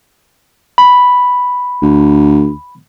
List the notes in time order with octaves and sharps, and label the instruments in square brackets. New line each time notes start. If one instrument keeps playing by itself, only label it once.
[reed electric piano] B5
[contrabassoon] D2